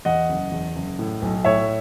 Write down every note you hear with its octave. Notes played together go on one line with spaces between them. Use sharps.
E2 D#5 F#5
F#1
E2
F#1
A2
B1
A2 C#5 E5